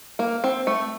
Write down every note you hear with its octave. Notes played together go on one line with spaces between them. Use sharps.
A#3
C4
A3